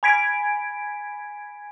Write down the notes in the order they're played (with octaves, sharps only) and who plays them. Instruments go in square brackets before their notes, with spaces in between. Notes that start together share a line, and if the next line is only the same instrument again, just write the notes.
[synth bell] G#5 B5 G#6 B6 D7